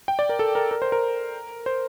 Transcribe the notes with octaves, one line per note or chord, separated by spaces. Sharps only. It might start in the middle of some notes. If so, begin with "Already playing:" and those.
G5
D5
A#4
A4
A#4
A#4
C5
A#4
C5